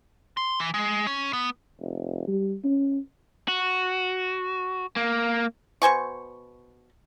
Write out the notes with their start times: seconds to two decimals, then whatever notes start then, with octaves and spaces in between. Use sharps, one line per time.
0.37 C6
0.60 E3
0.74 G#3
1.07 C#4
1.33 B3
1.80 F1
2.27 G3
2.64 C#4
3.48 F#4
4.96 A#3
5.82 B2 C5 G#5 C#6